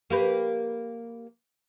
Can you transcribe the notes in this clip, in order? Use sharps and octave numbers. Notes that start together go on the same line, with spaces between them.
A#3 G4 B4